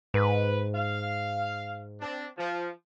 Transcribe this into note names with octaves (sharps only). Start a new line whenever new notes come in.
G#2 B4
F5
C4 D4
F3